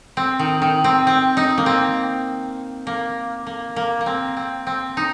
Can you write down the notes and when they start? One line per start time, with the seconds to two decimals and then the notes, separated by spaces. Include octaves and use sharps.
0.17 C4
0.39 D#3
0.62 D#3
0.84 C4
1.07 C4
1.37 D#4
1.58 A#3
1.66 C4
2.87 A#3
3.47 A#3
3.76 A#3
4.01 A#3
4.06 C4
4.37 C4
4.67 C4
4.97 D#4